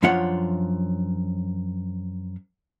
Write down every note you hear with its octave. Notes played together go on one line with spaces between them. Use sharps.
F#2 F3 D4 F4 C#5 F#5